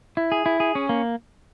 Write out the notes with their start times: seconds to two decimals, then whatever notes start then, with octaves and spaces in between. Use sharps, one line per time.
0.17 E4
0.32 G#4
0.46 E4
0.60 G#4
0.75 C#4
0.89 A#3